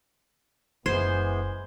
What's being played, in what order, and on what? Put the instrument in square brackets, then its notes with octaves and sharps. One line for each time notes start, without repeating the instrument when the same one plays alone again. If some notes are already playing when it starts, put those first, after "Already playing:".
[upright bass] F#1 [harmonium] E3 G#3 B3 [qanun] C5 [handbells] C6 G#6